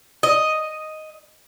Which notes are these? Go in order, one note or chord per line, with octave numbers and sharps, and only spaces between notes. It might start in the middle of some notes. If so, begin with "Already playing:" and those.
D#5